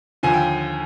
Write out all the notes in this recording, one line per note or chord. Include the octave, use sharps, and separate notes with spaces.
D#2 D3 F3 G#5
G5